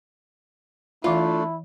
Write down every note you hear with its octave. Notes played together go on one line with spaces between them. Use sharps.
E3 A3 D4 E4 F4 E5